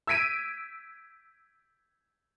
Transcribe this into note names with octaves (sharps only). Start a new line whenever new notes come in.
E6 G#6 B6 D7 D#7